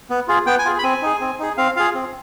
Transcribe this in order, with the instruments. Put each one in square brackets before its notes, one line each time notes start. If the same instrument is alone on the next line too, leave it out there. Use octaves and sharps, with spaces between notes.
[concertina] B3
F4 G#4
B3 G5
G#5
F4 G#4
B5
C4 G#5
D#4 G#4
C4
D#4 G#4
C4 F5
F4 G#4 F5
C4